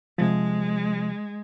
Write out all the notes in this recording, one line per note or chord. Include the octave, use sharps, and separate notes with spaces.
C3 F3 G#3